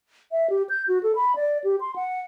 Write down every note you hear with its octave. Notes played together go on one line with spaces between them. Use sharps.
E5
G4
G6
F#4
A4
B5
D5
G4
C6
F#5